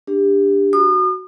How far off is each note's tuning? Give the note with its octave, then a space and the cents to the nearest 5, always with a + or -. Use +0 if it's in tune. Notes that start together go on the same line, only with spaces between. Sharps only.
D4 +0 G4 +25
F#4 +0 D#6 -40